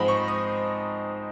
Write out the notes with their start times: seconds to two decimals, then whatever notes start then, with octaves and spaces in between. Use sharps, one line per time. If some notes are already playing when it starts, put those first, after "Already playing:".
Already playing: G#2 F3 G#3 C4 D#4 B5
0.08 C#6
0.28 D#6